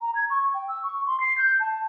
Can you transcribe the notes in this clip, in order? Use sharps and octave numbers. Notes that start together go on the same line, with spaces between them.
A#5
G#6
C#6
G5
E6
C#6
C6
C7
G6
A5